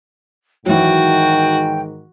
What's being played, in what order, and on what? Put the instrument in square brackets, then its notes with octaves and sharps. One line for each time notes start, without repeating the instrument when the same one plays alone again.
[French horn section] G#2 D#3 [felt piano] E3 F#3 [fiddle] F#4 [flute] G5